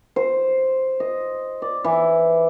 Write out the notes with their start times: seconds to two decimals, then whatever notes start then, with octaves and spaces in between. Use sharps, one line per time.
0.16 C5
1.00 D#5
1.62 D5
1.84 E3